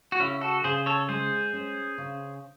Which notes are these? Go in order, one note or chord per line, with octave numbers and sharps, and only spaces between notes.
F#4
C#3 C#4 E4
F#4 A4
C#3 G#4 C5
A4 C#5
G#3 G#4 C5
C#4
C#3